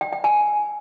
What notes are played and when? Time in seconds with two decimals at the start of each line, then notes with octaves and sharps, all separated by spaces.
0.01 G5
0.13 G5
0.24 G#5